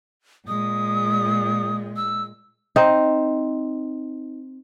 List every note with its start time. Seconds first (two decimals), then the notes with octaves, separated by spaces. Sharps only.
0.48 A#2 G#3 D#6
1.96 E6
2.76 C4 D#4